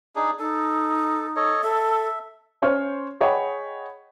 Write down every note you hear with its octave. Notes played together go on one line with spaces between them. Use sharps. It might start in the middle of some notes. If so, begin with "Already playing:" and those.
D4 D#4 G#4
D#4 A4
A4 C#5 D#5
A4 E5
C#4 C5 C#5 F6
G#4 C#5 D#5 F#5 G5 B5